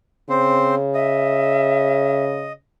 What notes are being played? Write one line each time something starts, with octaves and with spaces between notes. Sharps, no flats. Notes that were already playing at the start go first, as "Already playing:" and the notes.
C#3 C4 C5
D#5 E5